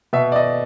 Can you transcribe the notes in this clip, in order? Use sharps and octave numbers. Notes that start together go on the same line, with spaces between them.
B2 E5
D5
D#5